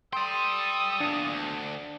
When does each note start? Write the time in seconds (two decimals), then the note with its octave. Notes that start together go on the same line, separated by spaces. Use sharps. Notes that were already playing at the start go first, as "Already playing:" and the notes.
0.13 A4 D5 G5 C6 D#6
1.00 E2 A#2 D4
1.32 D2